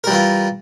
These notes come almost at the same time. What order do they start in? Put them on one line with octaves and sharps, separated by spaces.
A#4 G3 E3 F4